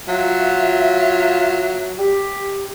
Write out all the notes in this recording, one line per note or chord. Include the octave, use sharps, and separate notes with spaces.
F#3 F4 E5
G4